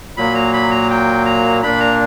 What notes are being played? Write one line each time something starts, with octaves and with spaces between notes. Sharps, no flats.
A#2 F#3 A#3 B5
A#5
B5
A#5
G5
A#5
A#2 A#3 D4 B5
A#5